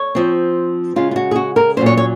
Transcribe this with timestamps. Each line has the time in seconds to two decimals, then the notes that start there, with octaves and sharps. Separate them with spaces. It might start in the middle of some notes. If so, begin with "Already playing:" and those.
Already playing: C#5
0.15 F3 C4
0.96 C#3 G#3 C#4 F4
1.11 F4
1.16 F#4
1.31 G#4
1.36 F#4
1.56 A#4
1.77 A#2 F#3 C#4 C5
1.86 C#5
1.97 C#5